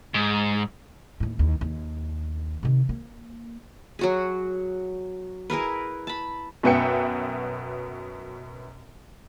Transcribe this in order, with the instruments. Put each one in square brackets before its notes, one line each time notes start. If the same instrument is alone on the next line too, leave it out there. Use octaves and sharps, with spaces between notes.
[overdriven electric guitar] G#2
[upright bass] D#2 A2
D#2
D#2
C3 D#3
A#3
[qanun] F#3 F#4 G#4
E4 G#4 A#4 B4
A5 B5
[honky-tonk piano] F#2 B2 B3 E5 G5 C#7